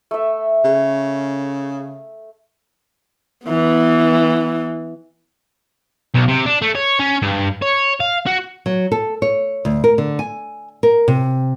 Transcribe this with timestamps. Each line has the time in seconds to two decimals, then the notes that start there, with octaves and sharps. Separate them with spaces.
0.11 A3 E5
0.65 C#3
3.47 E3 B3
6.14 B1
6.28 C3
6.46 D4
6.62 A3
6.75 C#5
6.99 C#4
7.22 G2
7.62 C#5
8.00 F5
8.26 F#4
8.66 F#3
8.92 A4
9.22 C#5
9.65 D2
9.84 A#4
9.98 D3
10.19 G#5
10.83 A#4
11.08 C3